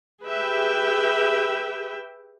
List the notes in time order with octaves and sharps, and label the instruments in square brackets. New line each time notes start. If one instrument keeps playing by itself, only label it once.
[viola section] G4 G#4 B4 E5 G5